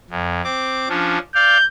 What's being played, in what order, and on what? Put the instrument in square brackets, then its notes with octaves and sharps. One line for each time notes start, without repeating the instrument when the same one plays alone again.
[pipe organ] F2
C4 D6
F3 C#4 D4
[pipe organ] D5 F5 [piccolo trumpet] G6